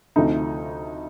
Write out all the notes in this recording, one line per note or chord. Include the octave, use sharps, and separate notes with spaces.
D2 C3 F3 A3 D#4